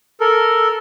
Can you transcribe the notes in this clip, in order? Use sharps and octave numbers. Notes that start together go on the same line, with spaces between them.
A4 A#4